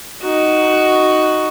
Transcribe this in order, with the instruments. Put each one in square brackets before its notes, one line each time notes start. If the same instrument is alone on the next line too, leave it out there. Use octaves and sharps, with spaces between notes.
[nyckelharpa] D#4 F#4